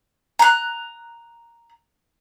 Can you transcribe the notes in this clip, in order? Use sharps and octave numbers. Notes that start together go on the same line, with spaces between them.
A#5 F#6